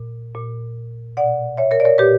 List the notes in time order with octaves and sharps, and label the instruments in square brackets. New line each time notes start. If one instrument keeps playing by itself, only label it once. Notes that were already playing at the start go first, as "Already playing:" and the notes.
Already playing: [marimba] A#2
A#2
B2 D5 F#5
C#5 E5
A#4 C#5
D5
A#4 C#5
A#2 G4 B4